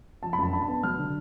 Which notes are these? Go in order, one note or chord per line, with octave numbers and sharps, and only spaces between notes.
F3 A5
B5
F#2 A5
D4 B5
A5
B3
F#3 F6
D3